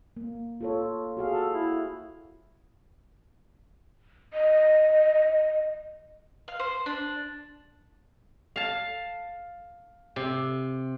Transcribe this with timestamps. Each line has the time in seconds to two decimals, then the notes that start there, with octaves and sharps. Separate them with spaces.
0.17 A#3
0.61 F4 A4 C#5
1.17 F#4 G#4 F5
1.31 A4
1.53 E4
4.34 D#5
6.48 F5
6.59 C5
6.86 D4
8.56 F5 A5
10.16 C3